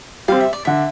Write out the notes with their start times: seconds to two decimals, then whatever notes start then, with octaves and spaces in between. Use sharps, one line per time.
0.28 G3 C4 F5
0.41 E5
0.53 D5
0.65 D3 E5